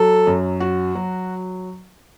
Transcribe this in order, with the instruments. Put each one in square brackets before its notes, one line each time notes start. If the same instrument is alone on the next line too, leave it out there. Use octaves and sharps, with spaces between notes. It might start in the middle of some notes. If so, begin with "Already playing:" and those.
Already playing: [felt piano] F#3 [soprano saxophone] A4
[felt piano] F#2
F#4
F#3